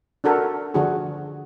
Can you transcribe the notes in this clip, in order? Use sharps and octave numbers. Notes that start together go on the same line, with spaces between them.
D4 F#4 A4 A#4
D3 F3 D4 F#4 G#4